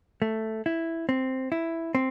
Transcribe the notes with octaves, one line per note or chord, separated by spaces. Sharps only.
A3
E4
C4
E4
C4